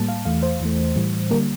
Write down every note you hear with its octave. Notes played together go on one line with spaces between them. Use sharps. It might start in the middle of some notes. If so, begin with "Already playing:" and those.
Already playing: A2 G3 A#3 A5
F5
E2 E3 A3 F5
C5
E2 E3 A3
A2 E3 G3
D3 G3 A#3 A#4